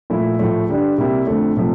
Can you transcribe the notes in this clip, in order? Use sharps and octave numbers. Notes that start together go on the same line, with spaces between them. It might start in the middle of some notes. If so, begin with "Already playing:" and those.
A#2 F3 A3 E4
A2 F3 A3
D3 G3 D4
C3 G3 A#3 E4
F2 D3 A3
C3 F3 A3